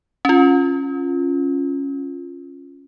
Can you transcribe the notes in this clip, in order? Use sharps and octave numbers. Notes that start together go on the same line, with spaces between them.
C#4 F4